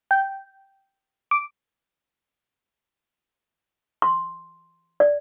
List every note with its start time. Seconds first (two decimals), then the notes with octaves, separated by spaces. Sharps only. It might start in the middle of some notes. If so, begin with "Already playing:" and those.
0.11 G5
1.31 D6
4.02 C6
5.00 D5